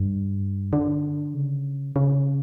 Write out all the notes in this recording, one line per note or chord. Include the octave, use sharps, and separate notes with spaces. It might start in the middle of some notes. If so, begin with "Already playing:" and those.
Already playing: G2
D3
C#3
C#3